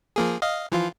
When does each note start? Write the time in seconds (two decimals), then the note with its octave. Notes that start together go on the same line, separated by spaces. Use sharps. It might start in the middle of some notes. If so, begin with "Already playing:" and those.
0.16 F3 A#3 G#4
0.42 D#5 F5
0.72 E3 F3 F4